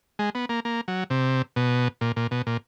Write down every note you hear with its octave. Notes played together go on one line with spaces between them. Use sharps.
G#3
B3
A#3
A#3
F#3
C3
B2
A#2
A#2
B2
A#2